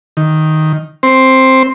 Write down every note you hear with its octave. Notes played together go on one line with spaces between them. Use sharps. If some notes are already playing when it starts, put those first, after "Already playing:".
D#3
C4 C5